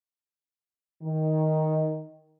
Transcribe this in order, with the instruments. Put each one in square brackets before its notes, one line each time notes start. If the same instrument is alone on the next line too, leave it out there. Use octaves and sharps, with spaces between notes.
[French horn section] D#3